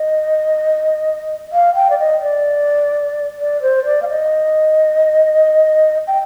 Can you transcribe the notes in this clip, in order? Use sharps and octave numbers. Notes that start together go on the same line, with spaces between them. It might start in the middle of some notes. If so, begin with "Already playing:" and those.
Already playing: D#5
F5
G5
D5
D#5
D5
D5
C5
D5
F5
D#5
G5